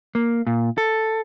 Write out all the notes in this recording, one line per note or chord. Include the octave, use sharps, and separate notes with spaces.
A#3
A#2
A4